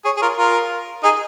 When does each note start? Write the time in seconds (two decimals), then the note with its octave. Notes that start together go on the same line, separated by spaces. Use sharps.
0.05 G#4 C#5
0.17 G#4
0.22 F4 A#4
0.38 F4 A#4
1.03 D#4 G#4